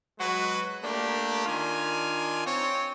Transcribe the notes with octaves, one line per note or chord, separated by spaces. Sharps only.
F#3 G#3 F#4 B4
A3 A#3 D4 G4
D#3 D4 F4 G#5
C4 C#5